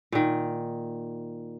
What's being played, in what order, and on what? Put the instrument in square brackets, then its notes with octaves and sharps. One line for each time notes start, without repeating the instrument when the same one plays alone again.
[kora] A#2 D#3